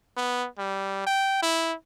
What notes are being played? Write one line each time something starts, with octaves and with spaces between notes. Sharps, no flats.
B3
G3
G5
E4